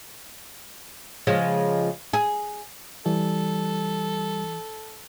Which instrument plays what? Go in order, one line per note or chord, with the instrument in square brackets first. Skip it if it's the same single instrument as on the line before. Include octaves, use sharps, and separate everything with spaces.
[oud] C#3 F3 G#3
G#4
[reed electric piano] E3 [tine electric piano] G3 [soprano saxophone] A4